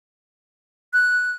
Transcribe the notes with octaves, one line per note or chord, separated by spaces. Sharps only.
F#6